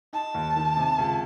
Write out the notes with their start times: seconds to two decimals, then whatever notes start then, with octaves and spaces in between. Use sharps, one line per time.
0.13 D#4 A5
0.34 D#2
0.56 D#3
0.77 C3
0.98 C#2